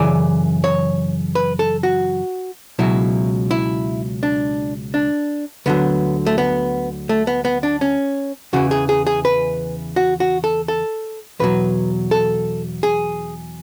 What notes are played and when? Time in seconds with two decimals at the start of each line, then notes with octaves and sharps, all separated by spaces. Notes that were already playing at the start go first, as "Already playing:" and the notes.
Already playing: F#2 C#3 E3 D5
0.64 C#5
1.35 B4
1.59 A4
1.83 F#4
2.79 C#2 B2 F#3 E4
3.51 E4
4.23 D4
4.94 D4
5.66 D2 D3 F#3 B3
6.27 A3
6.38 B3
7.09 A3
7.27 B3
7.45 B3
7.63 D4
7.81 C#4
8.53 E2 C#3 E3 F#4
8.71 G#4
8.89 G#4
9.07 G#4
9.25 B4
9.96 F#4
10.20 F#4
10.44 A4
10.68 A4
11.40 E2 B2 F#3 B4
12.11 A4
12.83 G#4